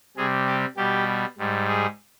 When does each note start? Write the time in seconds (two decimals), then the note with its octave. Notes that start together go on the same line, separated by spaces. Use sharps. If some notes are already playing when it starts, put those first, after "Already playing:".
0.17 C3 G3 G#4
0.47 G4
0.77 B2 G3 G4
1.38 G#2 G3
1.68 G#4